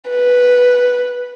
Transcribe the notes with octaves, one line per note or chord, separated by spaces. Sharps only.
B4